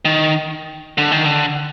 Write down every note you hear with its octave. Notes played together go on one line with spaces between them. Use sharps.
D#3
D3
D#3
D3